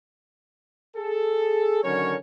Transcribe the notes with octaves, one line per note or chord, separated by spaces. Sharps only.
G#4 A4
D3 D#3 F#3 C#4 A#4 C#5